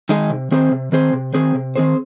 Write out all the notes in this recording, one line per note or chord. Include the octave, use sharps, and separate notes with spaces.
D#3 G#3 D#4 G#4
C3
D#3 C4 G#4 C5
C3
D#3 C4 G#4 C5
C3
D#3 C4 G#4 C5
C3
D#3 C4 G#4 C5